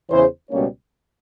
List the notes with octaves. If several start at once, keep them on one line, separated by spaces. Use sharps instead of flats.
E2 C#3 E3 C5
C#2 B2 G3 A#3 C#4 C#5